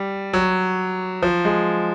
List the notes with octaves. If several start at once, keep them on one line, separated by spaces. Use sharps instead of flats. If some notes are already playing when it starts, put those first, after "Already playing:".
Already playing: G3
F#3
F3
G#3